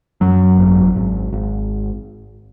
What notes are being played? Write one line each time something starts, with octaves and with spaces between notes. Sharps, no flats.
F#2 F#3
G#1
G#1
G#1